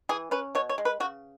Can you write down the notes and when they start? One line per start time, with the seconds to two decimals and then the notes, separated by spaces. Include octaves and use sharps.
0.09 E3 G#4
0.31 C#4 B4
0.55 B2 C#5
0.69 C#5
0.78 G#3
0.85 B4
1.00 C#3 F#4